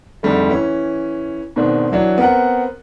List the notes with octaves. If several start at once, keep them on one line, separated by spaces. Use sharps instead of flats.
F2 G#2 D3 G3 A3
E3 C#4
G#2 B2 D#3 C4 D4
E3 F#3 D4
B3 C4 A#4 F#5